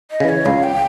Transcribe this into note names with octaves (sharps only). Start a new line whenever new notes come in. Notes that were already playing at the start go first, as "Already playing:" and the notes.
D#5
C#3 E3
C#5
C#2 F5
G5